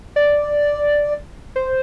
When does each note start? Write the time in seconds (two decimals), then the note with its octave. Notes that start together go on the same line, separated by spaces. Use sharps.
0.16 D5
1.56 C5